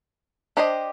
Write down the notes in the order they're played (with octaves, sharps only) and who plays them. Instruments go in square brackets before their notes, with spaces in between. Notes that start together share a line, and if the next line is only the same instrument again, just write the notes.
[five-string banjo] D4 G4 C5 D#5